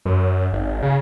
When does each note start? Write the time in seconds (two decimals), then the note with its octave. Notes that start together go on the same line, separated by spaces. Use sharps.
0.05 F#2
0.52 G#1
0.83 C#3